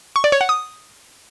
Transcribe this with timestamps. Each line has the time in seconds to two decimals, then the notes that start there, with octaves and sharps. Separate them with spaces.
0.16 C#6
0.24 D5
0.32 C#5
0.41 F#5
0.49 D#6